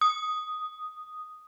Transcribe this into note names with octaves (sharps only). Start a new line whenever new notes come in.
D#6